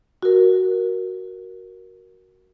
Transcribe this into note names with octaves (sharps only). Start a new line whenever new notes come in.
F#4 A#4